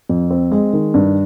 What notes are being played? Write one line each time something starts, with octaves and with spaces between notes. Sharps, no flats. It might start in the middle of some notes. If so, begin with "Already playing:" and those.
F2
C4
G#3
D#3
G2